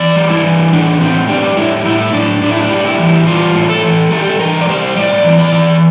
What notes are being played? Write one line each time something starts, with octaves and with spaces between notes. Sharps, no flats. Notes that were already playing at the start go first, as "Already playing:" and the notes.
Already playing: E3 D5
G3
E4
E3
A2 D4
A2 C4
G3 D4
A2 E4
A2 E4
A2 D4
A2 D4
E4
D4
G3
E4
E3
G3 F4
A2
A4
E3
G3 A4
G4
A4
E3 A#4
D5
G3 C5
A2 D5
E3
D5
E3